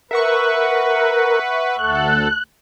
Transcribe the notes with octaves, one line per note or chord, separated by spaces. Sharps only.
A#4 B4 E5 F#5 C#6
D2 A4 F#6